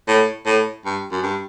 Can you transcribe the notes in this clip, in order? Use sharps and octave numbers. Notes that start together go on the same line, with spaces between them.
A2
A2
G2
F#2
G2